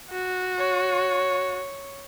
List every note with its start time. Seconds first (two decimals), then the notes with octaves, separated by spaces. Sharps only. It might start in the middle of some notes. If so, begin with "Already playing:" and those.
0.11 F#4
0.57 C#5